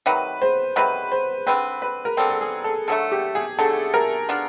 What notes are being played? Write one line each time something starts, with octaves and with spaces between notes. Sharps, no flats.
C3 D#3 F#3 B4
C5
C3 D#3 F#3 B4
C5
D3 G3 C4 B4
B4
A#4
D3 G3 C4 A4
A4
G#4
A4
D3 F#3 A3 A4
G4
G#4
D3 F#3 A3 A4
A#4
B3 D4 F4